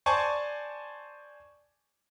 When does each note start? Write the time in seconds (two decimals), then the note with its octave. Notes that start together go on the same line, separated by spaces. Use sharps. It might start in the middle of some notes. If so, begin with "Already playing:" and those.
0.06 C5 D5 G#5 A5 C#6